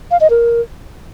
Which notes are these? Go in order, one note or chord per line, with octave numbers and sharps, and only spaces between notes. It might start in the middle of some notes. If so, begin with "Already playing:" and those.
F5
D#5
A#4